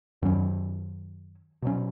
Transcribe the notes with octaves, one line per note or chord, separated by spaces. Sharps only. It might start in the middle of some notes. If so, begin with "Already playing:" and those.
F#2 D#3 F#3 C#4
B2 F#3 C#4